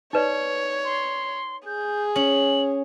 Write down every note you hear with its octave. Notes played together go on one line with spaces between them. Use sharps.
D#4 B4 C#5 D5
C6
G#4 G6
C#4 F#7